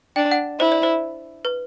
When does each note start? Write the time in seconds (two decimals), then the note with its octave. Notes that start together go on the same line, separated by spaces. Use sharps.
0.16 D4 G5
0.31 F#5
0.60 E4 C5
0.72 D5
0.83 C5
1.45 B4